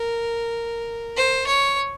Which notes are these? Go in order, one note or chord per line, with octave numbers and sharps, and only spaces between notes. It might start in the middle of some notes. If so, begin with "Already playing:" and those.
Already playing: A#4
C5
C#5